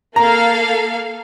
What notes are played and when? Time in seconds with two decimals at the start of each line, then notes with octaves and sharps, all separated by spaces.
0.16 A#3 A4 F5 A#5